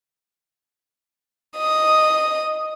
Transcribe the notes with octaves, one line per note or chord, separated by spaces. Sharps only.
D#5 D#6